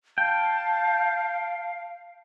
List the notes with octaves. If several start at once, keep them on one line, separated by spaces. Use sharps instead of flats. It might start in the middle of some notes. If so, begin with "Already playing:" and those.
F5 G5 A5